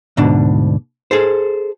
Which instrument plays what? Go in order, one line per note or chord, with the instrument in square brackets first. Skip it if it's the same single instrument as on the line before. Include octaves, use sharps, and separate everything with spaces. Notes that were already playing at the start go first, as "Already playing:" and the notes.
[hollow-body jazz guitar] D2 G#2 B2 D4
G#4 A4 C5